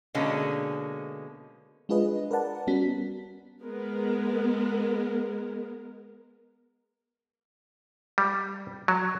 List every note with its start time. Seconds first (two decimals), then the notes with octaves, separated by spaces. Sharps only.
0.14 B2 D3 G#3 A#3 C#4
1.89 G#3 D4 F4 G#4 B4 D#5
2.31 A#4 B4 D5 F#5 A5
2.67 G3 B3 C#4 F#4 B6
3.61 G#3 B3 A#4
8.18 G3
8.88 F#3